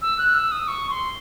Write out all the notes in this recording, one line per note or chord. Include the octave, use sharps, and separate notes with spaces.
E6
F#6
E6
D#6
C#6
C6